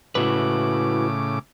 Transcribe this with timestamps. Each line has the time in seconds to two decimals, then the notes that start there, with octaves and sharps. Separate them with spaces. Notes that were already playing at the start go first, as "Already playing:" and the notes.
0.15 A2 C#3 E4 F#4 B4 D6